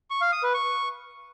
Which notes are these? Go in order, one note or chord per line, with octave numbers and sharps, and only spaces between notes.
C#6
F5
D#6
B4
C#6